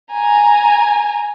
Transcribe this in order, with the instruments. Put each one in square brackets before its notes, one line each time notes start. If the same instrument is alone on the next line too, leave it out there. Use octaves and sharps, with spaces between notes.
[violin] G#5 A#5